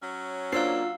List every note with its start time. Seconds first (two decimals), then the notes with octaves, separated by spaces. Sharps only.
0.02 F#3 C#4
0.52 A#3 D4 F4 C5 F5 E6 C7